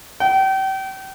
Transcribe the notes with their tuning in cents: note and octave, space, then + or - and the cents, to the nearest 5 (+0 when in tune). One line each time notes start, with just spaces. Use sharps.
G5 -35